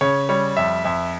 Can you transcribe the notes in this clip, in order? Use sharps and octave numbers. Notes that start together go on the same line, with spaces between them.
C#3 C#5
G3 C#5
F2 E5
F2 E5